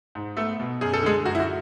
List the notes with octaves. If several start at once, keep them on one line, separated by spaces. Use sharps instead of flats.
G#2
A3 B3 A4
B2
F#2 G#4
A4
D3 G#3 G#4
F#2 F#4
E4
F#4